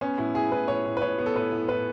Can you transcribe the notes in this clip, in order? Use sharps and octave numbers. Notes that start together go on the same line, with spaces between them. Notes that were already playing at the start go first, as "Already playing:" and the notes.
B3 C#4
A2 E4
A2 G#4
A2 B4
A2 C#5
A2
B4
A2 C#5
B3
A4
A2 B4
A2
A2 B4